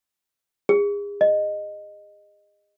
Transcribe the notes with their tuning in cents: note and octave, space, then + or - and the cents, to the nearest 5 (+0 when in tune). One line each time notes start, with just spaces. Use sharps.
G#4 -35
D#5 -15